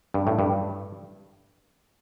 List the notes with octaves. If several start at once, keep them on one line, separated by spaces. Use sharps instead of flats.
G2
A2
G2